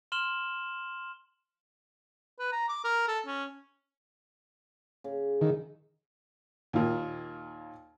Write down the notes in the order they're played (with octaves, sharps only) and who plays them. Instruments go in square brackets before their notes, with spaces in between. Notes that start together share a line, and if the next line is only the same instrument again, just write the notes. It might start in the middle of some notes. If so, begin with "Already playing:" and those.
[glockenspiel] C6 F6 E7 F#7 G7
[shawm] B4
A#5
D6
A#4
A4
C#4
[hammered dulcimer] C#3
[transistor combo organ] D#3
[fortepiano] D#2 A#2 D#3